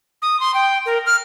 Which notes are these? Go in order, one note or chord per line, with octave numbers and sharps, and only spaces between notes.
D#6
C6
G5
A#4
F6